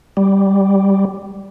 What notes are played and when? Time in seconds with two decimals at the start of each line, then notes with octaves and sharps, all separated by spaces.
0.17 G3